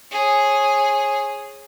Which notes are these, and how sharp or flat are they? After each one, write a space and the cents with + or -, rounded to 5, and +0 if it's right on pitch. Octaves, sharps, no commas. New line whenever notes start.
G#4 +0 C#5 -25